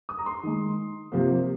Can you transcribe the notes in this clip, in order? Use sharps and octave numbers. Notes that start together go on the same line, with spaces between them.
D#6
A#5
C6
D#3 G#3
C3 F3 A#3